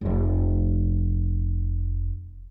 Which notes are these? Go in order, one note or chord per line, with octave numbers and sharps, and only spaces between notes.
F1 F3